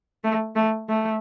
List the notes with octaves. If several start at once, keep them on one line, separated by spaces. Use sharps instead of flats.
A3
A3
A3